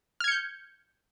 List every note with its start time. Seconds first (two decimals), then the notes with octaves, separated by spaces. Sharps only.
0.20 F6
0.24 G#6
0.28 C#7
0.31 G6